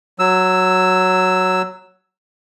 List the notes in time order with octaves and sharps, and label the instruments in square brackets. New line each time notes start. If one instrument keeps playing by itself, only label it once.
[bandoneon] F#3 E6